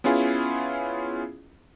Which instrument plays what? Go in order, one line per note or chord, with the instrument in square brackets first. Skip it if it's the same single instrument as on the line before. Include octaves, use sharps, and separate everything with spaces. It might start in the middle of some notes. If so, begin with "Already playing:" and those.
[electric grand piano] B3 C#4 E4 F4 G#4